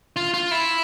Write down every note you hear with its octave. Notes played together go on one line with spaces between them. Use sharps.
F4
F4
E4